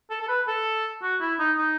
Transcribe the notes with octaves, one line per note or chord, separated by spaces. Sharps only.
A4
A4
B4
A4
F#4
E4
D#4
D#4